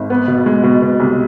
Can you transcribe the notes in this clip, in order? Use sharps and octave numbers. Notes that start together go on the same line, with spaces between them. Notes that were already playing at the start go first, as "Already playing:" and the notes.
Already playing: G#1
B3
B2
G#3
B2
B2
C2